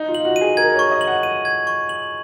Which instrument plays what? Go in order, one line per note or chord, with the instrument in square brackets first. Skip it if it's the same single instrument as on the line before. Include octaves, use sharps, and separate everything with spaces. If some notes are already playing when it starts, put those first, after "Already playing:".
Already playing: [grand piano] D#4
F4
[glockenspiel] F#7
[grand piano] F#4
[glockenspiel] D#7
[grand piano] G#4
[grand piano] A#4 [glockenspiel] G#6
[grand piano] C#5 [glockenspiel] C#6
[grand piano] D#5
[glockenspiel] F#7
[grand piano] F#5
[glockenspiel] D#7
G#6
C#6
F#7